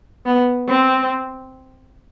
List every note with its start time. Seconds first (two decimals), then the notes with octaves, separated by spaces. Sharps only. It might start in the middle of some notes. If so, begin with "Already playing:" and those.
0.26 B3
0.68 C4